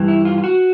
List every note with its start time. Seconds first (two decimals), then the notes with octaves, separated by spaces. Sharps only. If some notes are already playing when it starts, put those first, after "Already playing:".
Already playing: G2 E3
0.08 E4
0.25 F4
0.38 F4
0.44 F#4